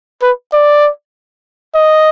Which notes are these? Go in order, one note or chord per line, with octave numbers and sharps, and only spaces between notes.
B4
D5
D#5